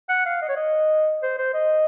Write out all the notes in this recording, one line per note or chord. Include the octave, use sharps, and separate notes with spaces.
F#5
F5
D#5
C#5
D#5
C5
C5
D#5